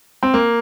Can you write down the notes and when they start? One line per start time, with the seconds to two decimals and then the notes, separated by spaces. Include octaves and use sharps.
0.23 C4
0.34 A#3